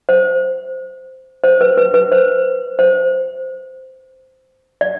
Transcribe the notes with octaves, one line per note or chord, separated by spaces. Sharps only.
C5
C5
B4
B4
B4
C5
C5
D5